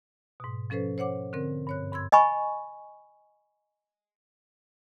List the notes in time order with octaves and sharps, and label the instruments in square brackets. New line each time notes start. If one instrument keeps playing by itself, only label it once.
[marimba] G#2 B2
F3 C#4 A4 B4 C5
C5 C#5 F#5 D6
D3 C4 A#4
G2 C#5 F#6
G2 C6 E6 G#6
[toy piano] D#5 G#5 B5 C#6